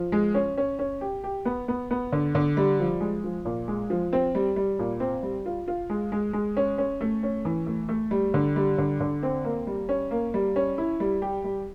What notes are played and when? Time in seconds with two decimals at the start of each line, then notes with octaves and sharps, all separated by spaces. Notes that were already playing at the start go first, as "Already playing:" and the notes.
Already playing: F3
0.12 G#3
0.34 C#4
0.57 C#4
0.79 C#4
1.01 G4
1.24 G4
1.45 B3
1.68 B3
1.91 B3
2.12 D3
2.35 D3
2.57 G3
2.79 F3
3.00 G#3
3.24 F3
3.45 A#2
3.68 G#3
3.90 F3
4.13 C4
4.35 G3
4.56 G3
4.79 A#2
5.00 C4
5.23 G3
5.46 F4
5.68 F4
5.90 G#3
6.12 G#3
6.33 G#3
6.57 C#4
6.78 C#4
7.01 A3
7.23 C#4
7.45 E3
7.66 A3
7.89 A3
8.11 G3
8.34 D3
8.56 G3
8.78 D3
9.01 D3
9.23 C4
9.44 A#3
9.67 G3
9.89 C#4
10.11 A#3
10.34 G3
10.56 C#4
10.78 E4
11.00 G3
11.22 G4
11.44 G3